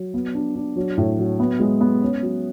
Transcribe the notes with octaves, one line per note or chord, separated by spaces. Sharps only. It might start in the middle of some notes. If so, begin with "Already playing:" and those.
Already playing: F#3
B3
D4
D4
F#3
A2
F#3
B3
G#3
B3
C#4
F#3